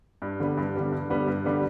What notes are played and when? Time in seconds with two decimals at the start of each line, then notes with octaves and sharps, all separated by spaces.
0.22 G2
0.40 D3 G3 B3
0.57 G2
0.75 D3 G3 B3
0.92 G2
1.10 D3 G3 B3
1.27 G2
1.44 D3 G3 B3